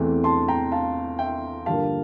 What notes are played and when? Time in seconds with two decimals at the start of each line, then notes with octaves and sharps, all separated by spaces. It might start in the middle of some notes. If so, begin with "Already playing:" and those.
Already playing: E2 E3 A3 C4
0.24 A5 C6
0.48 G5 A#5
0.72 F5 A5
1.19 E5 G5
1.66 G2 D3 F3 A#3 F5 A5